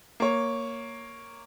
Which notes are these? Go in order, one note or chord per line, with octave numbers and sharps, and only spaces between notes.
A#3 C#5